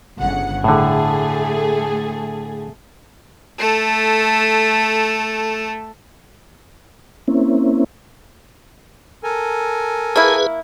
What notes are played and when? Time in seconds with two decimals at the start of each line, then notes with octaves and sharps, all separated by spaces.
0.19 G1 C#3 F#5
0.64 A2 D3 A3 G#4 A4
3.58 A3 A4
7.28 A#3 C4 C#4 E4
9.23 A4 A#4 G#5
10.16 A#3 E4 G#4 B4